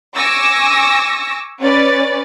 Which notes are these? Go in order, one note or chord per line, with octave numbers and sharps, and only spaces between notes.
G#5 C#6 D6 E6 A#6
C#4 B4 D5 A6